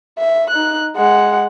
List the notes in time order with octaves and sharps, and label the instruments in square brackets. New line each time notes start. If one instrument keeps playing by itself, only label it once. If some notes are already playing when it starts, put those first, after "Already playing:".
[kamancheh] E5
D#4 F#6
G#3 F#5